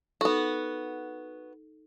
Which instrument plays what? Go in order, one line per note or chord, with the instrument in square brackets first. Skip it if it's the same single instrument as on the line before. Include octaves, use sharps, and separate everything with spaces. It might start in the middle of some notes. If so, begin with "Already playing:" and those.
[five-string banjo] B3 F#4 [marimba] D#4 A4